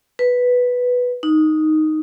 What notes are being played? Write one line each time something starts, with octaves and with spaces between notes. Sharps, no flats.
B4
D#4